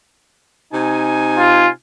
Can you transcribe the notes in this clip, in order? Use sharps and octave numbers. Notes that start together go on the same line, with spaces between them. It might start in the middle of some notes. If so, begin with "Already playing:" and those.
C3 D#4 G#5
F4